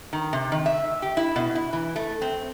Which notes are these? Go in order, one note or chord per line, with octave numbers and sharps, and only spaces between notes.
D#3
C3
D#3
E5
G4
E4
B2
E4
E3
A3
C4